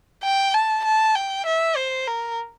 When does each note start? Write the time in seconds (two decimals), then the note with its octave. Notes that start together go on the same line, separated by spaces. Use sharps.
0.23 G5
0.54 A5
0.85 A5
1.15 G5
1.46 E5
1.77 C5
2.08 A#4